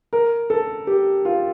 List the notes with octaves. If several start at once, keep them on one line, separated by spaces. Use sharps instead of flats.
A#4
A4
G4
F4